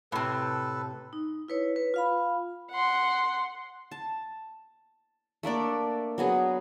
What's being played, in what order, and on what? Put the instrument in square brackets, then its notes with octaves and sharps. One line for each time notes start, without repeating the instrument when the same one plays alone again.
[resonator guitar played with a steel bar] A2 C3 [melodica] A4 B4
[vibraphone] D#4
E4 B4 C#5
B4
F4 F5 B5
[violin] F#5 C6
[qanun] A5
A3 A#3 D4 D5
F#3 B3 G#4